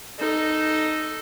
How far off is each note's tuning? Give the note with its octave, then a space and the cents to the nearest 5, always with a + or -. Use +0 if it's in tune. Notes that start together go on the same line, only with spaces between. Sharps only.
D#4 -5 A4 +0